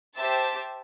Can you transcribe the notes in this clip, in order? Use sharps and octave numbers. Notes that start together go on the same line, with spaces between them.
G4 C5 E5 A5